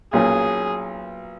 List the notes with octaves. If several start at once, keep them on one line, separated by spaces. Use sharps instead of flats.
B1 A#2 F#3 A#3 C#4 G#4